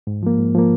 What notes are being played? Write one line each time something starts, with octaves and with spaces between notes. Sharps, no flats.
G#2
F3 A#3
G#2
F3 A#3